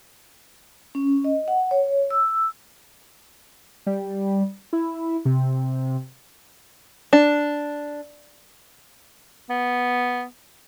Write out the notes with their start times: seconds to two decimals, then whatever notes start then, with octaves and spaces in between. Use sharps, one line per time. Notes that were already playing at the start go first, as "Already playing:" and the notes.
0.95 C#4
1.24 D#5
1.48 F#5
1.71 C#5
2.10 E6
3.86 G3
4.73 E4
5.25 C3
7.13 D4
9.50 B3